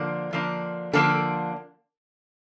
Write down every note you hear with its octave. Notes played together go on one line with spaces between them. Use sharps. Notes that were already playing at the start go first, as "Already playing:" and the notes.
Already playing: D3 F3 A#3 D4
D3 F3 A#3 D4
D3 F3 A#3 D4 A4